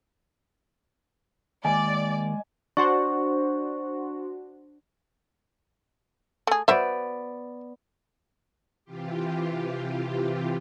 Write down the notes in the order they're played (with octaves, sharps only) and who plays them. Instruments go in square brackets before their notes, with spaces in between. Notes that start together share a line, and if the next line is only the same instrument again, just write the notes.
[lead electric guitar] D#2 [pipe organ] G#3 [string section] D5 [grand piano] G#5
[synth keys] D4 F#4 C5 [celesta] C#6
[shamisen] A3 G#4
[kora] B3 D5 [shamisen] F#4 C5 E5
[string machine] C3 E3 F4 G4